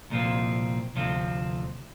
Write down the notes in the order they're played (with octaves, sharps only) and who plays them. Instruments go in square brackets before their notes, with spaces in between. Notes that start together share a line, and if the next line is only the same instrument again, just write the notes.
[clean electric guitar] C2 A#2 F3 C4
D2 C3 F3 C4